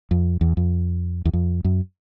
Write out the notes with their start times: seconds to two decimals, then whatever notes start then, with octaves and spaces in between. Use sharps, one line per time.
0.11 F2
0.41 E2
0.57 F2
1.25 E2
1.33 F2
1.64 F#2